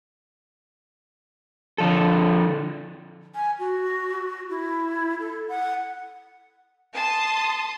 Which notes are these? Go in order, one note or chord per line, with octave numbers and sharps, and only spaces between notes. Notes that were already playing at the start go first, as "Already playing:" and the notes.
D3 F3 A4
G#5
F#4
E4
A4
F#5
A5 C6 D#6